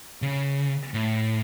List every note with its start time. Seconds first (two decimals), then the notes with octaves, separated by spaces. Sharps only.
0.22 C#3
0.94 A2